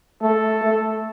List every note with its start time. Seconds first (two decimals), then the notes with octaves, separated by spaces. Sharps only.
0.22 A3 A4
0.62 A3